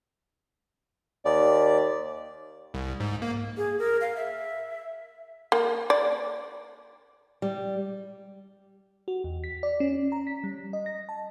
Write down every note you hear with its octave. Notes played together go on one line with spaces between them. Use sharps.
D#2 D5
C2
G#2
A#3
G#4
A#4
F5
E5
A#3
D5
G3
F#4
E2
B6
D5
C#4
A#5
B6
G3
D#5
A#6
A5